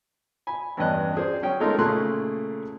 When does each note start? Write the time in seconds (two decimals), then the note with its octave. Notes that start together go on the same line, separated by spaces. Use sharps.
0.47 G#5 B5
0.77 E2 G2 C#4 D4 D#5 F#6
1.17 G#4 C5 D5
1.42 F#3 C#4 G5
1.60 G#3 A3 D#4 F4 A4 A#4
1.78 A#2 C#3 A3 G#4 C6 F#6